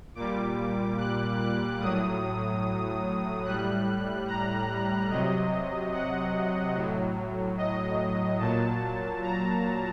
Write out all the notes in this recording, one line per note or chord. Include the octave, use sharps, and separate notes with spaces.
A#2 G3 D6
F#6
F#6
A2 F#3 D#6
A2 G3 F#6
A#5
C3 F#3 D#5
F#5
A2 F#3
D#5
A#2 F#3 A5
A#5